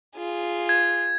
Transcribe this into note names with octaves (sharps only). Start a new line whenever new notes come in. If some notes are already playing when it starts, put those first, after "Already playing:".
F4 G#4
G#6